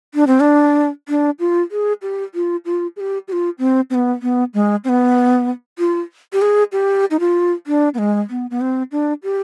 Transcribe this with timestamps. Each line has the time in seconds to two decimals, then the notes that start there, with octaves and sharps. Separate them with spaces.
0.14 D4
0.27 C4
0.40 D4
1.09 D4
1.39 F4
1.71 G#4
2.02 G4
2.35 F4
2.65 F4
2.96 G#4
3.00 G4
3.28 G4
3.32 F4
3.59 C4
3.90 C4
3.94 B3
4.22 B3
4.54 G#3
4.84 C4
4.89 B3
5.79 F4
6.33 G4
6.42 G#4
6.72 G4
7.11 D#4
7.20 F4
7.67 D4
7.94 B3
7.98 G#3
8.30 B3
8.51 B3
8.61 C4
8.92 D4
9.23 G4